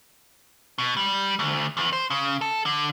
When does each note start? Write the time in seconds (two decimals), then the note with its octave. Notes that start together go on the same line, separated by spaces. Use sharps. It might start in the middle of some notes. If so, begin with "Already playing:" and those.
0.78 B2
0.97 G3
1.39 D2
1.77 E2
1.93 C5
2.10 C#3
2.41 A4
2.66 D3